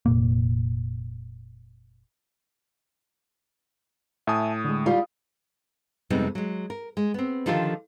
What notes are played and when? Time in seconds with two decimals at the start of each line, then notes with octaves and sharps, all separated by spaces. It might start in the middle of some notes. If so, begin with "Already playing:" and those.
0.06 F1 A#2 A#3
4.27 A2 E5 G#5 A5 D#6
4.65 D3 G#3
4.86 G3 F4
6.10 F2 C3 G3 G#3 B3 D#4
6.35 F#3 G#3
6.70 A#4
6.97 G#3
7.14 B3 C4
7.46 D3 D#3 F3 F4 G4 A4